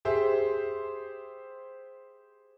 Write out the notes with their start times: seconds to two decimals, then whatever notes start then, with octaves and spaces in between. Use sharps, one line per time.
0.05 G4 G#4 C5 E5